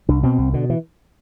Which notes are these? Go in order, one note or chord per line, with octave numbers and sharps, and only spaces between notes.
C2 D4
B2 C4
C2
B2 D3
E3